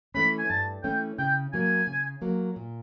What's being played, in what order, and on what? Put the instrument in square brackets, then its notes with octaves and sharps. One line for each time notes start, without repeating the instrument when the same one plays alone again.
[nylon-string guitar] E3 A3 C#4 [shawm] B5
[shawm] G#5
[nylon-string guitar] G2 [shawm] A5
[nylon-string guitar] E3 A3 C#4 [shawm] G5
[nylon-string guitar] C#3 [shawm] G5
[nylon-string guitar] F#3 A#3 [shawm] G#5
[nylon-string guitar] C#3
F#3 A#3
A#2